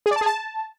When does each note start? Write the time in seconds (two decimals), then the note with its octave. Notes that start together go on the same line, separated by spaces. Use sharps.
0.06 G#4
0.11 D5
0.16 A5
0.21 G#4
0.26 A5